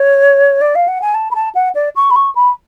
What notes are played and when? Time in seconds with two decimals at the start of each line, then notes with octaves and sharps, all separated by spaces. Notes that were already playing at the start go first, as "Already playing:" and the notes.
Already playing: C#5
0.61 D5
0.75 F5
0.87 F#5
1.01 G#5
1.14 A5
1.31 B5
1.35 A5
1.55 F#5
1.75 D5
1.95 C#6
2.10 B5
2.16 C#6
2.35 B5